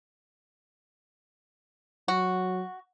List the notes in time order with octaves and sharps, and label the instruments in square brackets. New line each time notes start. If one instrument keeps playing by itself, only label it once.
[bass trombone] F#3 [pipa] F#4